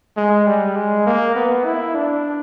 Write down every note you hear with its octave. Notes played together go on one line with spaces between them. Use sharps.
G#3
G3
G#3
A#3
B3
E4
D4